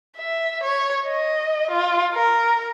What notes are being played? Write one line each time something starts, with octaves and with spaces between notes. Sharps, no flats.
E5
C#5
D#5
F4
A#4